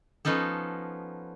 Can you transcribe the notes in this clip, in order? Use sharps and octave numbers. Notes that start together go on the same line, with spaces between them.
F3 B3 C#4 D#4 A4